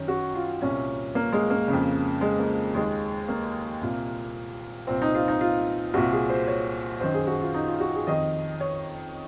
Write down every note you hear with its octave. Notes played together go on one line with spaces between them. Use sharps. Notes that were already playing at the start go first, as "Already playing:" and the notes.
Already playing: F#2 D#3 C#4
F#4
F4
C2 A#2 C#4
A#3
G#3
A#3
F2 C#3
G#3
A#3
D#2 D#3 G#3
A#3
C2 A#2
C2 A#2 C4
D#4
F4
D#4
F4
C2 A#2 F#4
G#4
C5
C#5
F#2 D#3 C5
G#4
F#4
F4
D#4
F4
F#4
G#4
F2 D#3 D#5
C#5